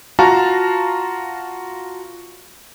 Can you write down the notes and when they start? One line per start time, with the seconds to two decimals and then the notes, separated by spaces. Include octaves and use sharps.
0.19 F4 F#4 F5 A5 A#5